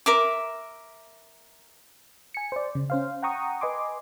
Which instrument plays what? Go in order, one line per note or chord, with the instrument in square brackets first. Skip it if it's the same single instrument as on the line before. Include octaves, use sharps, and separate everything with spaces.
[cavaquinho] A#4 E5 D6
[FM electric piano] G#5 C#7
C5 D5
C#3
C#4 C5 F5
F#5 G5 A#5 C#6 D#6
B4 D#5 G#5 C6 D6